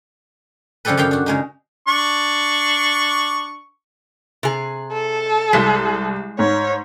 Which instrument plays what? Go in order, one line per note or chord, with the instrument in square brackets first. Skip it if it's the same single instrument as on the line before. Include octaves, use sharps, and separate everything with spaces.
[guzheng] C#3 F3 G3 G4 A4 B4
F#2 G4 F5 G5
D4 F#4
C#3 G#3 D#4
[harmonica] D4 C#6
[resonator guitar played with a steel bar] C3 G#4
[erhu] A4
[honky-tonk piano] C2 B6 [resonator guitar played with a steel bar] G#3
[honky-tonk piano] G#2 [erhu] C#5